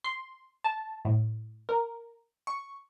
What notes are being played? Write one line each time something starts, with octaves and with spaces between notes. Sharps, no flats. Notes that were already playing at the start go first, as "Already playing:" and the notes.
C6
A5
A2
A#4
C#6